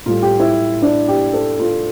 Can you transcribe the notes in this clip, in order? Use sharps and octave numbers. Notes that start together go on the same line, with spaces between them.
A2 G3 F4
G4
E4
D4
G4
A4
F4